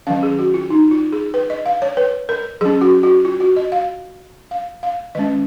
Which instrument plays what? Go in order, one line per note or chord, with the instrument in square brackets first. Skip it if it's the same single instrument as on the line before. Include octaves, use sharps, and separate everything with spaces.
[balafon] D#3 F#3 C#4 F5
G#4
F#4
F4
D#4
F4
G#4
B4
D#5
F5
C#5
B4
A#4
F#3 C#4 G#4
F#4
F#4
F4
F#4
D#5
F5
F5
F5
D#3 G#3 C#4 D#5